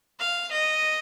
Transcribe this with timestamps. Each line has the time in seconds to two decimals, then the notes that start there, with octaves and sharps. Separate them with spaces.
0.19 F5
0.51 D#5